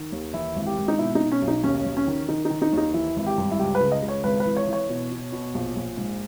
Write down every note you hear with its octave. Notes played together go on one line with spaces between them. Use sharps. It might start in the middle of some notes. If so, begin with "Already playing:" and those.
Already playing: D#3
D#2
E3 E4
G#1
G4
G#1
D#4
B2 E4
D#4
B2
C#4
B1
D#4
D#2 C#4
D#2
C#4
D#3
D#3 D#4
D#4
D#3
D#4
D#2
D#4
E3 E4
G#1 E4
G4
G2
E4
C#2 G4
B4
C#3
D#5
C#2
C#5
G#1 B4
B4
E3
C#5
E3
C#5
B2
B2
B2
A#1
A#1
G#2